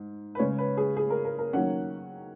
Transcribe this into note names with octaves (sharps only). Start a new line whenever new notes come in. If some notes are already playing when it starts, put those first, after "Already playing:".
Already playing: G#2
B4
C#3 G#3 C#4 C#5
B4
G#4
G#4
A#4
A#4
A#4
D#3 F#3 A#3 C#4 F#5